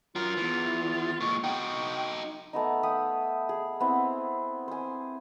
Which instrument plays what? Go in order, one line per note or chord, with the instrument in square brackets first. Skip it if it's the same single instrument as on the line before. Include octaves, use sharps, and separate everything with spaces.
[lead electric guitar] F#3 A#4 [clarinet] F4
[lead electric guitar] E2 E3
[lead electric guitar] A#2 G#3 [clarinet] C#6
[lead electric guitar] D#4 F#4 [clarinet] G5
[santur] A3 B3 D#4
E5 F#5 G5 D#6
G#4
B3 C4 E4
C5 G#5